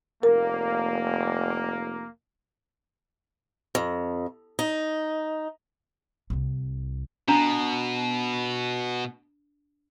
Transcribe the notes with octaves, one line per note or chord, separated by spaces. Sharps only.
F1 A#3 A#4
F2
D#4
C2 C4
B2 D4 A#5